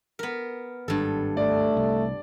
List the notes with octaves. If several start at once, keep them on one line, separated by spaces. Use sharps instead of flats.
B3 A#4
G#1 G2 A4
A3 D5
C2